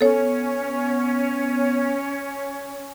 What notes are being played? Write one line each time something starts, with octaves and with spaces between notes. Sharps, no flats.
B3 C#4 A4 C#5